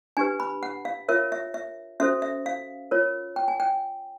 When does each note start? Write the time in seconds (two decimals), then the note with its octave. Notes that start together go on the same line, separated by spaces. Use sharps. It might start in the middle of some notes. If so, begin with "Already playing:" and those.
0.17 D4 G4 B4 G#5
0.40 B5
0.63 F#5
0.85 F5
1.08 F4 A#4 C#5 E5
1.32 E5
1.54 E5
2.00 C#4 F#4 A4 C5 E5
2.22 E5
2.46 F5
2.91 F4 A#4 C#5
3.36 G5
3.48 G#5
3.60 G5